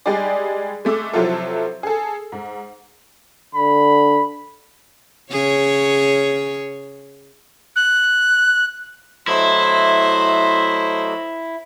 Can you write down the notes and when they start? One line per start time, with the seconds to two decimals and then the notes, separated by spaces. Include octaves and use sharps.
0.06 G3 G#3 D#4 G4 G#4 D5
0.85 G#3 A3 D6 E6
1.13 C3 F3 F#3 E4 F4 A4
1.83 G#4 A4
2.32 G#2
3.55 D3 B5
5.31 C#3 G#4 C#5
7.76 F#6
9.27 F#3 A3 E4 C5 D#5